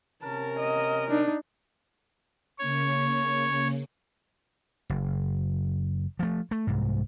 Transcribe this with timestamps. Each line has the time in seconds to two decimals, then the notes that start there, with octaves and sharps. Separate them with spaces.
0.22 C3 C#4 A#4 A5
0.59 D#5
1.09 D4 D#4
2.58 C#3 A#3 C#4 C#5
4.90 F#1
6.19 F3 A3
6.51 A3
6.67 C2 G#2